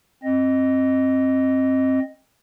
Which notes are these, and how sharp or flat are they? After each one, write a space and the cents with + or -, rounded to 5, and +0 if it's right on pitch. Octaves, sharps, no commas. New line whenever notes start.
C4 +20 D#5 +0